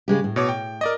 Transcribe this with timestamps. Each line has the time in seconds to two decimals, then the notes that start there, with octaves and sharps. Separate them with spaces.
0.08 C#3 G#3 G4
0.24 A2
0.36 B2 C#5 D6
0.49 G5
0.81 A#4 D5 D#5